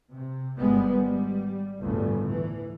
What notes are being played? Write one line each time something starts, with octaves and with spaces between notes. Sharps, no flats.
C3
G#1 G#2 G3 G#3 B3
G3
G1 D2 A2 C#3
E3